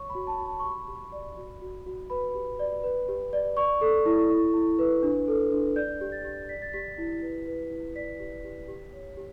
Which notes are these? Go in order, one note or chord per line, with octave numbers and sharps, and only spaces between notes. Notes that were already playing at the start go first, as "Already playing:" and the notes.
Already playing: C#5 C#6
B5
F#4
A5
F#4 B5
A5
C#6
G4 B5
G4
D5
F#4
F#4
F#4
B4 B5
G4
D5
B4
G4
D5
D5 C#6
A4
E4
E4
E4
B4
D4
A4
D4
D5 G6
G4
A6
G4
D5 B6
A6
G4 B6
E4
B4
B4
E4
D5 B6
G4
G4
G4
C#5
G4